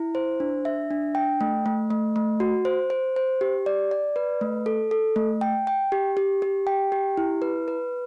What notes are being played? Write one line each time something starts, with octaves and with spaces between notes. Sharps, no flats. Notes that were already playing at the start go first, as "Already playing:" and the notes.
Already playing: E4
C5
D4
E5
D4
G5
A3
A3
A3
A3
F#4
C5
C5
C5
G4
D5
D5
B4
A3
A4
A4
A3
G5
G5
G4
G4
G4
G5
G4
E4
B4
B4